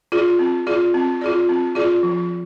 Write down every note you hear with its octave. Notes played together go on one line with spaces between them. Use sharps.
F4 G#4 D5
C4
F4 G#4 D5
C4
F4 G#4 D5
C4
F4 G#4 D5
F3